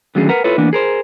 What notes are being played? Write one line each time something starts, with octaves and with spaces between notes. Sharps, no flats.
D3 D#3 F#3 A3 C#4 G#4
A#4 B4 F#5 A#5
E4 F4 A4 B4 C#5
E3 A#3 B3 D4
G#4 A#4 C5